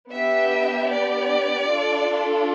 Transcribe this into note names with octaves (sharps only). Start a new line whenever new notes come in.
B3 D4 G4 E5
D5
D4 F4 A4